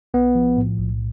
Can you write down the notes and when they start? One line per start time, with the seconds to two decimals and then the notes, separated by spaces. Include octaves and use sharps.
0.14 B1 B3
0.35 F3
0.57 A2
0.78 B1